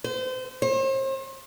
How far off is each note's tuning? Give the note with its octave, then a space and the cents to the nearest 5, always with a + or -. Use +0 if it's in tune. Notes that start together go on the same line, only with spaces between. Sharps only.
C5 -35
C5 +40